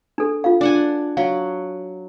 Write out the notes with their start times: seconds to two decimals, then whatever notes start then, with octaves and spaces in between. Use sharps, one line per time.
0.18 D4 A4
0.44 F4 F5
0.61 D4 F#5 G#5
1.17 F#3 F5